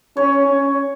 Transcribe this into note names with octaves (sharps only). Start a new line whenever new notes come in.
C#4 C#5
C#4